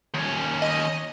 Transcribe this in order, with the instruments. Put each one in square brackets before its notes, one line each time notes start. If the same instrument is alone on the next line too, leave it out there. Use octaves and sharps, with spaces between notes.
[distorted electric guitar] D#2 C#4
[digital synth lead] D#5